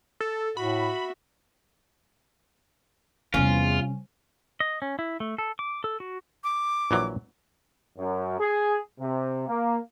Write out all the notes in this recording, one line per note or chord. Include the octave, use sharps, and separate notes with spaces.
A4
A2 F#4 E5 B5
E2 C3 G3 C#4 F4
D#5
C#4
E4
A3
A4
D6
A4
F#4
D6
A#1 E3 F#3
F#2
G#4
C3
A#3